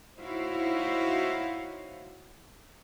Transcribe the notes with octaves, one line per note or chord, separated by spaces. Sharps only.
D#4 E4 F#4 C5 C#5 F5